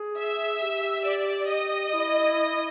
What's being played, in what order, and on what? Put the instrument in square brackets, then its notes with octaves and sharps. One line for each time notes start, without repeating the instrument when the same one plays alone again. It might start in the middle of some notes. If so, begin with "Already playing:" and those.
Already playing: [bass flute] G#4
[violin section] E5
[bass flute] G4
[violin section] D5
D#5
[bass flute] E4